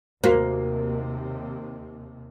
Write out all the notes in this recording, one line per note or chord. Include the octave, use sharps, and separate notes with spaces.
D#2 C3 A#3 F#4 C5